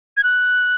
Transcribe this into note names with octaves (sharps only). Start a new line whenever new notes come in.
G#6
F#6